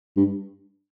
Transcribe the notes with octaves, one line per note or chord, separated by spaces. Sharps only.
G2